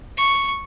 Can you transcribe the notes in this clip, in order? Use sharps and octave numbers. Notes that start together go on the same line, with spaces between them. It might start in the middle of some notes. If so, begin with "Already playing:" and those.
C#6